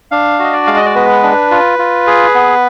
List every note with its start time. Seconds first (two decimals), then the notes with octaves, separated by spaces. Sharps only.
0.11 D4 F5
0.40 F#4 D#5
0.53 D5
0.67 G#3 F5
0.76 D#5
0.85 D5
0.95 B3 B4
1.23 D4
1.51 F4
1.79 F4
2.07 G#4
2.35 B3